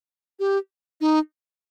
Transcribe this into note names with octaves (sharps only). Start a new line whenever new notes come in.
G4
D#4